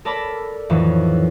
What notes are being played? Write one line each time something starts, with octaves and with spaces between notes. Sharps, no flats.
A4 A#4 D5 A5 B5
F2 A2 D#3 E3 F#3